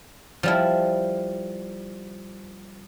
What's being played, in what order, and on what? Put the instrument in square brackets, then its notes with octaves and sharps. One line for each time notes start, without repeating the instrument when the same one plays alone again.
[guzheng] F3 G3 E4